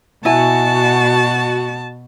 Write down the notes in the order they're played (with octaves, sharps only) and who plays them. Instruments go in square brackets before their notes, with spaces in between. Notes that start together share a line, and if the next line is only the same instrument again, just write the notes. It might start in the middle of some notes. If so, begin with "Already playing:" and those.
[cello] B2 [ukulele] E4 G#5 [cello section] F#4 [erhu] A5